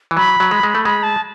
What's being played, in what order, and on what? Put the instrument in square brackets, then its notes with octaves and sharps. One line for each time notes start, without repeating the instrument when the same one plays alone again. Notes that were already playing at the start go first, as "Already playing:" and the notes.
[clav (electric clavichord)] E3
[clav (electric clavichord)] F#3 [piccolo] B5
[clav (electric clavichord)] F#3
G#3
G#3
A3
[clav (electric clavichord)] G#3 [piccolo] B5
[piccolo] A5